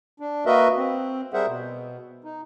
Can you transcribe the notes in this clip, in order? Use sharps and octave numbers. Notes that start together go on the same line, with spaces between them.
D4
A#3 F#4 A#4 B4 D#5 E5
C4
G3 G#4 A#4 C5 E5 F#5
B2
D#4